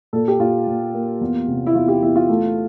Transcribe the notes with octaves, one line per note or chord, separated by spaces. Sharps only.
A#2 A4
G4
A#2 F4
A#2
A#3
E2
C3
E4
E2 F4
G4
E2 E4
F4
A3